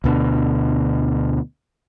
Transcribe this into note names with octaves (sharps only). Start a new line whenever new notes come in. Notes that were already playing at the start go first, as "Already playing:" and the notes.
D2 B2 D3